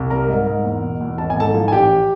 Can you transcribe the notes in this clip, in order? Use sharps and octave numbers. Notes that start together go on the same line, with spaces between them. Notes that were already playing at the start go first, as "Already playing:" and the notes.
Already playing: C2
G3 A#4 A#5
G#2
G#2
E2
B2
E2
G#1 A5
G#5
G#2 A4 A5
F3
G#5
A1 G4 G5